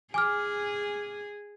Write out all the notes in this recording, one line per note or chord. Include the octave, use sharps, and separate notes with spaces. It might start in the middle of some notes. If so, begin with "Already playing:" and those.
G#4 G#5 D6 F6